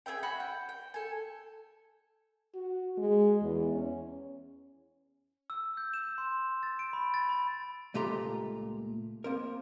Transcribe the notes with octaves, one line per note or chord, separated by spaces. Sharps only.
G#4 C#5 E5 G5
F#4 F#5 G#5 B5
G5
G5
A4 G#5
F#4
G#3
E2
C#4
E6
G6
E7
C6
A6
D7
B5
A6
B5
C#2 A#2 A3 G4 A#5 C6
A#3 C4 A#4